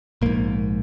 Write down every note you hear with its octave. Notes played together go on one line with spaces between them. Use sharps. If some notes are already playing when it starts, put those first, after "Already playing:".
A#1 G#2 A#3